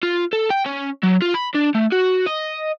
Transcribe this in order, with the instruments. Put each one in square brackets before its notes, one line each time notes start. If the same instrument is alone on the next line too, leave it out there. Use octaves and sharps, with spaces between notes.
[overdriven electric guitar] F4
A4
G5
C#4
F#3
F4
B5
D4
A3
F#4
D#5